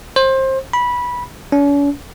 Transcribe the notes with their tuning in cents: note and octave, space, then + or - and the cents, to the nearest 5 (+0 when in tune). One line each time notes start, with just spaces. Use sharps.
C5 +25
B5 -15
C#4 +45